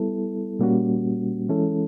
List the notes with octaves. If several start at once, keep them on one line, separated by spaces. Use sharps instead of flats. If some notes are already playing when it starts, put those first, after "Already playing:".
Already playing: G3 B3 E4 A4
A#2 G3 A#3 C#4 F#4
E3 G#3 C#4 E4 A4